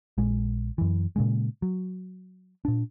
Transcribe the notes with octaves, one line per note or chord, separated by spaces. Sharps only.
A#1 G#3
F#2 E3
A#2 C#3 G#3
F#3
A#2 D4